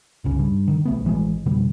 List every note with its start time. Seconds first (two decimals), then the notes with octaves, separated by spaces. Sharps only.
0.24 G1 C#2 C#3
0.39 G2
0.68 D3 D#3
0.85 B1 A3 B3
1.05 A1 E3 G3 G#3
1.46 F2 B2 D3 G3